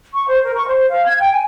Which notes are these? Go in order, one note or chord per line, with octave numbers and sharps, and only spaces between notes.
C#6
C5
A#4
C#6
C5
F5
G#6
G5
G#5